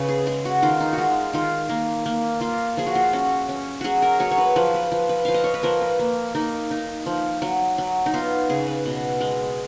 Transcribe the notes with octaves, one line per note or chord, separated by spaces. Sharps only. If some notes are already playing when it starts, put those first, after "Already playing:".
Already playing: C#3 B4 C#5
G#4
G#3 G#4
F#4
D#3 F4
D#4
F#4
G#3 F4
D#3 F4
A#3
A#3
A#3 F4
F3 G#4
F#4
F4
C#4 F#4
C#4
F#3 F#4 G#4
A#4
F#3 C#5
C#5
B4
F3 B4
B4
F3
B4
F3 F5
D#5
C#5
B4
F3 A#4
B4
A#3
A#3 D#4
D#4
F3
F#3
F#3
D#4
B3 F4
C#3 G#4
B4
B2
G#3